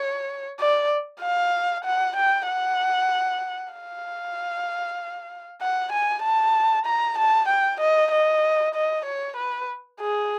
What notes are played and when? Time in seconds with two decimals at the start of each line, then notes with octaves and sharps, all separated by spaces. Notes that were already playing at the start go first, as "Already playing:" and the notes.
Already playing: C#5
0.59 D5
1.21 F5
1.84 F#5
2.16 G5
2.47 F#5
3.73 F5
5.61 F#5
5.92 G#5
6.23 A5
6.86 A#5
7.18 A5
7.48 G5
7.81 D#5
8.12 D#5
8.74 D#5
9.06 C#5
9.37 B4
10.00 G#4